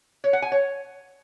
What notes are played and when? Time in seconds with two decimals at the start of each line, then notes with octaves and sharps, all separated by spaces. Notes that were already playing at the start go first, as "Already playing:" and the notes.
0.24 C#5
0.33 F#5
0.42 G#5
0.52 C#5